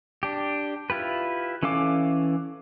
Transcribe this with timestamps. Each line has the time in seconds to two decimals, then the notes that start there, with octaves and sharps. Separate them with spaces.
0.23 D4 G4
0.90 E4 F4 G4 B4
1.63 E3 C#4 A4 F5 D6